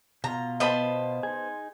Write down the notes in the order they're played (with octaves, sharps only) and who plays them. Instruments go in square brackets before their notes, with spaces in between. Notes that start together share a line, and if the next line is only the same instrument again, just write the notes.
[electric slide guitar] B2 F4 [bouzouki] A#5
[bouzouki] B3 C5 [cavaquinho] D#5 A5 B5
[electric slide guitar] D#4 G#4